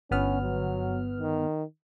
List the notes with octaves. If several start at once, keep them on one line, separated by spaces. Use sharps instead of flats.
G1 B3 C#4 F6
F#3
D#3